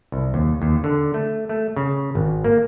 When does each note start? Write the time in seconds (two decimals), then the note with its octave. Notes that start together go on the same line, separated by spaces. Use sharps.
0.12 C2
0.34 D#2
0.62 D#2
0.84 D3
1.14 A3
1.49 A3
1.76 C#3
2.15 G#1
2.44 A#3